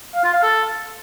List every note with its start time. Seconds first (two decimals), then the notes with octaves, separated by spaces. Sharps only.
0.15 F5
0.24 F4
0.33 F5
0.43 A4